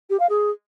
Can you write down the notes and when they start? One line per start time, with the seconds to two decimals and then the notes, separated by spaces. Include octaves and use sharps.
0.10 G4
0.19 F5
0.29 G#4